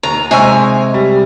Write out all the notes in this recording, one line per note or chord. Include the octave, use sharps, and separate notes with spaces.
D#2 A#5
C3 G#3 D#5 G#5 C#6 E6
G3